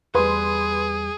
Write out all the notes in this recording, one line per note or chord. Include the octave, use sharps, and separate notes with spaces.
E2 G3 G#4 B4 C6